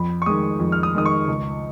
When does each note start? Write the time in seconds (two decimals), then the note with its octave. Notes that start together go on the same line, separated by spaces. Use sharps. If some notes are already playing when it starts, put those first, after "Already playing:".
Already playing: F2 B5
0.22 C#6
0.26 D#3 G#3 D#6
0.60 F2
0.72 F6
0.83 D#6
0.94 D#3 G#3 D#6
1.05 C#6
1.28 C#2